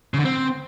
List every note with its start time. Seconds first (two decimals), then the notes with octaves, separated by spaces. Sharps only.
0.14 C#3
0.19 D3
0.25 C4